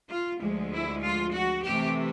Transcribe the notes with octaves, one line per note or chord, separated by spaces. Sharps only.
F4
D2 D3 F3 G#3
E4
F4
F#4
C3 E3 A3 G4